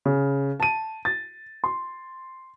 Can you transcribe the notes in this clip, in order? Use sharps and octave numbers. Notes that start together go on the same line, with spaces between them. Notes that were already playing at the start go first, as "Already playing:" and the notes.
C#3
A5 D#7
A6
C6